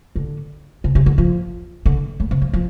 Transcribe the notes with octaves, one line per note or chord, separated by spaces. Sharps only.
D3
C3
C3
D3
F3
D3
A2
C3
F3
F3